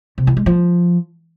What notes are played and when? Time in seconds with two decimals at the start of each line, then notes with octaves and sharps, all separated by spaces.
0.18 C3
0.27 E3
0.37 G#3
0.46 F3